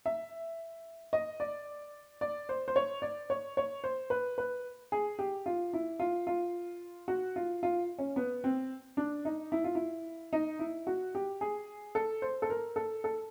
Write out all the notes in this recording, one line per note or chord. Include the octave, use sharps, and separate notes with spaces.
E5
D#5
D5
D5
C5
C5
C#5
D5
C#5
C#5
C5
B4
B4
G#4
G4
F4
E4
F4
F4
F#4
F4
F4
C#4
B3
C4
D4
D#4
E4
F4
E4
D#4
E4
F#4
G4
G#4
A4
C5
A4
A#4
A4
A4